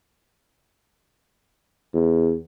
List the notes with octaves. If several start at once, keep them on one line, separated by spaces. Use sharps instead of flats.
E2